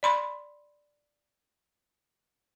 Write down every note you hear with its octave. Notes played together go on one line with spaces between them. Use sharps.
D5 B5 C6